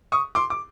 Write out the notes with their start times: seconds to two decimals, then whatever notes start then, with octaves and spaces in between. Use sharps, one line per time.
0.12 C#6 D#6
0.35 C6 D6
0.50 D6